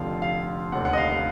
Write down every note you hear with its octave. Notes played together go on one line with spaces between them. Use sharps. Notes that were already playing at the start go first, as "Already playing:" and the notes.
Already playing: F1 F2 D3 F3 F5
F5
F1 D#2 D3 F#5
F#5
D#5
F5
F5